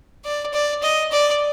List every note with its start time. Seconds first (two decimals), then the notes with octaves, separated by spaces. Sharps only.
0.25 D5
0.53 D5
0.83 D#5
1.12 D5